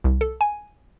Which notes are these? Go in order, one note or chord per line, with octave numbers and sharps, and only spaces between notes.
C2
A4
G#5